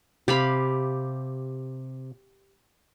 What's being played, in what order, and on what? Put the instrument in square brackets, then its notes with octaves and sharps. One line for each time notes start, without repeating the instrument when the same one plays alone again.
[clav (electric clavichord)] C3 [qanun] G4 F5 B5